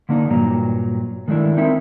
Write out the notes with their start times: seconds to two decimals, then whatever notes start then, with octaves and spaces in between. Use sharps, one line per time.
0.09 D3 A#3 D4 D#4
0.30 G2 A#2 F#3 A#5
1.28 D#3 G#3 A3 D4 E4
1.57 C4 D#4 E4 A#4 E5